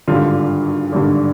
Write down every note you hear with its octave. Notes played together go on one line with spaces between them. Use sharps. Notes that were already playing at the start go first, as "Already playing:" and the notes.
G#1 G2 D3 F4
G#1 G2 D3